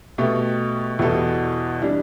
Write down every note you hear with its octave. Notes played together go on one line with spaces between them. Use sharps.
B2 A3 G4
E2 B2 G3 E4 A4
E3 G3 D4